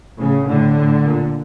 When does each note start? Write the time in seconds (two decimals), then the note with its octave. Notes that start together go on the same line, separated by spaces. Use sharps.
0.18 A2 C#3
0.47 A2 D3
0.76 A2
1.04 A#2